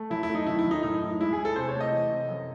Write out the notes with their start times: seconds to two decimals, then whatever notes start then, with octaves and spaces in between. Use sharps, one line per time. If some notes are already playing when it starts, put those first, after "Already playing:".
Already playing: A3
0.10 F#2 E4
0.23 E4
0.29 A3
0.35 D#4
0.47 D#3 E4
0.59 E4
0.66 F#2
0.71 D#4
0.83 A2 D#4
1.02 A2
1.20 G#3 E4
1.33 G#4
1.38 G#3
1.45 A4
1.56 C3 C5
1.69 C#5
1.75 A3
1.81 D#5
1.92 E3
2.11 C3
2.29 F#2